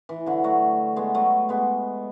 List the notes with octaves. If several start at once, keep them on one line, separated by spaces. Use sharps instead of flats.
E3
D3 F#3
F#3 A3
G#3 B3
F#3 A3
G#3 B3